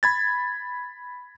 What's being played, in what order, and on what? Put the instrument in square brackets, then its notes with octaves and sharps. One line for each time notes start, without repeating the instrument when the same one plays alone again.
[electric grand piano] B5 G#6 A6